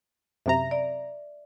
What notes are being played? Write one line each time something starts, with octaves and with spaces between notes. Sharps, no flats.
F#2 C3 E5 A#5
D5